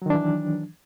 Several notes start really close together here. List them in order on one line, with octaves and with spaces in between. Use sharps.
F#3 D#3 D4 E3